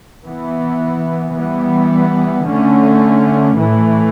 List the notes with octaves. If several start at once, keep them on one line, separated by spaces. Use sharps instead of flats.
E3 B3
E3 G3 B3
D3 A3 C#4
A2 E3 A3